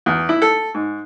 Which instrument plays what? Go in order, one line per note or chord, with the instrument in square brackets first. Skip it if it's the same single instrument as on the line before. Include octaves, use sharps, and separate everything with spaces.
[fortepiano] E2
E4
A4
G#2